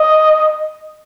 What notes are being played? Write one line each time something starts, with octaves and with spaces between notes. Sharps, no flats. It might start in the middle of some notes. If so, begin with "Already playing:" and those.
Already playing: D#5